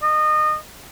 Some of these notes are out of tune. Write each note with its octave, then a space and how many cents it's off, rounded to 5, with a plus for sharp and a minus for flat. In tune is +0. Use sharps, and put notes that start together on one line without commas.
D#5 -25